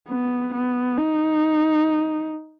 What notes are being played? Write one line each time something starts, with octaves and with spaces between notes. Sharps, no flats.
B3
B3
D#4